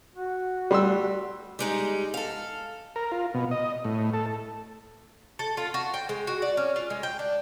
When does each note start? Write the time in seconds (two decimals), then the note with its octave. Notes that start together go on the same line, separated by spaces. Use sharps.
0.15 F#4
0.71 G3 C6 E6
1.59 G3 G#3 D#4
2.14 A4 F5
2.96 A#4
3.12 F4
3.34 B2
3.51 D#5
3.84 A2
4.14 A4
5.39 A4
5.57 F4
5.74 F#4
5.94 G5
6.09 G#3
6.27 F#4
6.42 D5
6.57 C#4
6.76 F4
6.90 G#3
7.03 G5
7.19 D4